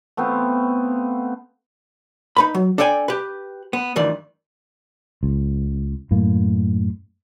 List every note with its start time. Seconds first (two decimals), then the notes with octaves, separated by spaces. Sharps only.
0.17 A3 B3 C4 F4
2.36 D#4 B4 B5
2.54 F#3
2.78 D4 A4 D5 G5 G#5
3.08 G4 B4
3.73 B3
3.96 D2 G2 D#3 E3 D5
5.23 C#2
6.11 F#2 A2 A#3